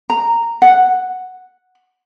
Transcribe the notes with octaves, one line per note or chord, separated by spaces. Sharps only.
A#5
F#5